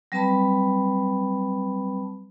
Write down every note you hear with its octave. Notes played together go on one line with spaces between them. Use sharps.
F#3 G3 C4 B4 A5 B5